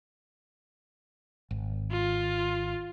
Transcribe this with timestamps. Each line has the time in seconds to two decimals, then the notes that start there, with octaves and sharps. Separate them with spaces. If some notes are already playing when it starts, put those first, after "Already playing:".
1.51 G#1
1.91 F4